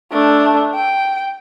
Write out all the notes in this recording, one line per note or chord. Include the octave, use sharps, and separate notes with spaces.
A3 D4
G5